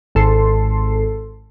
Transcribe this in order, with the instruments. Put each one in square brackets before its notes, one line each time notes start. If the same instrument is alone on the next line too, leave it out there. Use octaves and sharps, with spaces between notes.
[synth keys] G#1 A4 C6